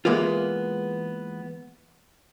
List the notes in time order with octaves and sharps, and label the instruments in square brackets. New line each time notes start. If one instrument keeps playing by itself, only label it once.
[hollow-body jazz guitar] E3 G#3 A#3 B3 F4